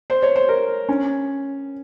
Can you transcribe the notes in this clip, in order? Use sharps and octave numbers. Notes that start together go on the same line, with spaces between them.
C5
C#5
C5
A#4
C#4